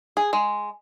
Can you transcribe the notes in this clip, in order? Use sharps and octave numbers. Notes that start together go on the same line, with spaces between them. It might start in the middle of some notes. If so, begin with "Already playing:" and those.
G#4
G#3